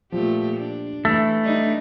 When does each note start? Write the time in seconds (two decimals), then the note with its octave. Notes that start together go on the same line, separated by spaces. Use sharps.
0.12 A#2 F3 A3 G4
0.57 D4
1.05 E3 A3 E6
1.43 G3 D4 D#4